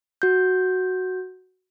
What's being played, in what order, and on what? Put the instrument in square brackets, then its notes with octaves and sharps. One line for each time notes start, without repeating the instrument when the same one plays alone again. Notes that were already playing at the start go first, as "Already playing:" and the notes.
[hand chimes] F#4 G6